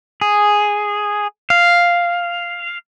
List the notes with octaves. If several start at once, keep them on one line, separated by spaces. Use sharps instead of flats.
G#4
F5